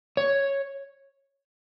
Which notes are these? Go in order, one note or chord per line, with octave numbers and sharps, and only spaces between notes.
C#5